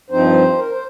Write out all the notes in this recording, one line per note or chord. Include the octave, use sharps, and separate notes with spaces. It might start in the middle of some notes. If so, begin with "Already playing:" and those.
G2 F3 C4 D#4 C5
A#4
C5